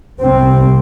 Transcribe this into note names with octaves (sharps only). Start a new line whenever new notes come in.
C2 C3 C4